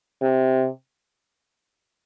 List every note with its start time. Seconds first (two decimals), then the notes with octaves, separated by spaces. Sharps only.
0.22 C3